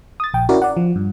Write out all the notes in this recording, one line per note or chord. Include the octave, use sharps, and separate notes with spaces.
D#6 A6
A#1 G5
C#4 E4 F#4 A#4 D5
D5 F#5
F3
G2